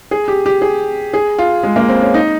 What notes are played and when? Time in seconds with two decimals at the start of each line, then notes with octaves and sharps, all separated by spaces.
0.11 G#4
0.28 G4
0.46 G4
0.62 G#4
1.14 G#4
1.38 F4
1.63 G#3
1.76 A#3
1.89 C4
2.02 C#4
2.14 D#4